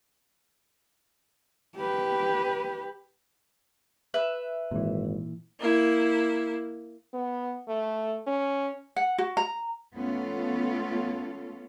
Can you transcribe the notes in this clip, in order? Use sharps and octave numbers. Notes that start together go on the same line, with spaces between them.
G4 B4
B4 E5 F#6
G#1 A#2 E3
A#3 E4
B3
A3
C#4
F#5
F#4
A#5
A3 B3 C#4 F4 A4